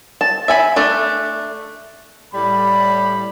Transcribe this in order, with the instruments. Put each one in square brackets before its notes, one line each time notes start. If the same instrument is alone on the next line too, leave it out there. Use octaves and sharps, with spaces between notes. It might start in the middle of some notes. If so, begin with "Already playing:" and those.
[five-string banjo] A5
E5 G#5 B5
A3 D4
[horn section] A2 G3 B5